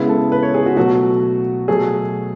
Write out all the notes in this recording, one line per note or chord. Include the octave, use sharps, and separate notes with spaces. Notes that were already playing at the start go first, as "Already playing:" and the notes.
Already playing: C#3 G#3 B3 E4
A4
B4
C#5
G#4
F#4
B2 F#3 A3 F#4
B2 F#3 A3 G#4